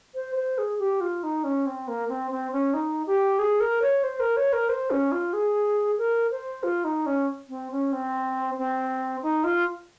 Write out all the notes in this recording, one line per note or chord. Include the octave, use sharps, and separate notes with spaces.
C5
C5
G#4
G4
F4
D#4
C#4
C4
A#3
C4
C4
C#4
D#4
G4
G#4
A#4
C#5
C5
A#4
C#5
A#4
C5
C#4
F4
G#4
A#4
C5
F4
D#4
C#4
C4
C#4
C4
C4
D#4
F4